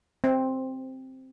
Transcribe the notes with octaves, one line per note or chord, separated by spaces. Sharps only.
C4